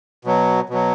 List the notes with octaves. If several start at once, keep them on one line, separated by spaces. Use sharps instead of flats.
B2 F#3
B2 F#3